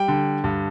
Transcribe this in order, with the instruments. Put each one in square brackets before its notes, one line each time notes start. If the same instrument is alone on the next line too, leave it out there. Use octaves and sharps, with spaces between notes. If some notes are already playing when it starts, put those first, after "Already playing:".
Already playing: [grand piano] G3 G5
D3
G2